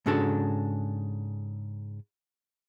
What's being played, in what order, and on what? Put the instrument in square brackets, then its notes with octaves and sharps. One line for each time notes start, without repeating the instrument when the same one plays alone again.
[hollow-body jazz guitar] G#2 C#3 D4 F#4 A4